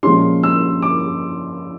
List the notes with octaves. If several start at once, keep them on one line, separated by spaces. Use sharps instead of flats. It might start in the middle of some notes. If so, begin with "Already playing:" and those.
A#2 F3 G#3 C#4 C6
E6
D6